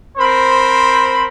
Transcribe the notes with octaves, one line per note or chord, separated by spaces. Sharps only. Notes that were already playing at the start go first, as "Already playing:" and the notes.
C4 A#4 C5 B5